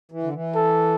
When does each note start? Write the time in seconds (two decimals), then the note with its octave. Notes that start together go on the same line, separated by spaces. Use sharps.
0.12 E3
0.23 D3
0.33 E3
0.56 A4